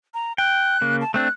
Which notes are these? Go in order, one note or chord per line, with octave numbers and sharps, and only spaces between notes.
A#5
G5 F#6
C#3 A#3
A5
A3 C4 D4 F#6